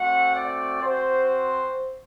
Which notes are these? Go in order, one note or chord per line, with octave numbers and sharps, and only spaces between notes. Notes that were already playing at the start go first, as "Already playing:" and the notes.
Already playing: A3 C4 F#4 F#5
D5
C4 F#4 C5